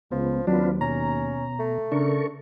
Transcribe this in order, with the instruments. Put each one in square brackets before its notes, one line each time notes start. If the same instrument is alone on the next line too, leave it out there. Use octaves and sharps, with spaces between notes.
[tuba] C#2 [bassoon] F3 [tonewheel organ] B3
[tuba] D#2 [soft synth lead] F#3 [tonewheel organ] C4 F4 B4 [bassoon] D4
[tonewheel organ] B2 [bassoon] C#4 [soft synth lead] A#5
[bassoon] A3
[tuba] C#3 [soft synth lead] D4 [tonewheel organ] A4 A#4 C#6